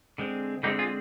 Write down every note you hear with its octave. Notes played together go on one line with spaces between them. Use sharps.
D3 G#3 C4
D3 G#3 C4 D#4 G4
F4 G#4